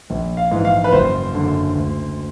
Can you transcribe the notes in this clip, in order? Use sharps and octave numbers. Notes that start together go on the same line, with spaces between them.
A#1
F5
G#2 E3
F5
B4
F#1 C5
F#2 D3
D2